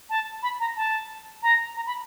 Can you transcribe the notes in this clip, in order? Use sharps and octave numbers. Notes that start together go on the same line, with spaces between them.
A5
B5
A#5
A5
A#5
A#5
B5